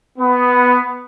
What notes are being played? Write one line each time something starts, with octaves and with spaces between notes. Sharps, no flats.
B3